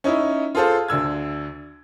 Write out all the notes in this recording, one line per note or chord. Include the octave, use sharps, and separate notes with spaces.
C#4 D#4 E4
F4 G#4 A4 C5 F5
D2 D3 E6 G#6